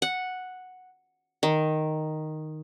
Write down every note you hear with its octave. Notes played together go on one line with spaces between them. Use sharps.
F#5
D#3